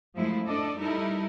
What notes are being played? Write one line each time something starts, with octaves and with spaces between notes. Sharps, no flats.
F#2 F3 G#3 A3 E4
D4 A4 D5 D#5
G3 D#4 E4 A4 A#4